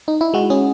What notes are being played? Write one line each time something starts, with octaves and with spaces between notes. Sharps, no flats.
D#4
E4
G#3 F#4
C#4 G#4